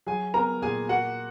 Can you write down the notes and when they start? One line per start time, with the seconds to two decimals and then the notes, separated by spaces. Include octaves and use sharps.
0.06 F#3 G#4 G#5
0.34 B3 A#4 A#5
0.61 A#2 G#4 G#5
0.89 A#3 F#4 F#5